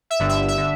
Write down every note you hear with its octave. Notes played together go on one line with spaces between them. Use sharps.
E5
G1 G2 D3
E5
E5
D3